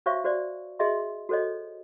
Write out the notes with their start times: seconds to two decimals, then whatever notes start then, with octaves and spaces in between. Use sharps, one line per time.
0.06 F#4 C5 C#5 E5 F5 C#6
0.24 F#4 C5 D5
0.79 F#4 G#4 D#5 E5 C6
1.29 F#4 A4 C5 C#5 D#5